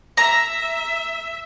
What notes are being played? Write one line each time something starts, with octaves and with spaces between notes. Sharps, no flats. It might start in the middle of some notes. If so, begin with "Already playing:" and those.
E5 A#5